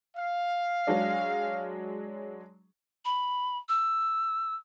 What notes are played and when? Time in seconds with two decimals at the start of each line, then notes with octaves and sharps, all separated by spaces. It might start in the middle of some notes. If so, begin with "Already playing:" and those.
0.17 F5
0.87 F#3 G#3 D4
3.05 B5
3.69 E6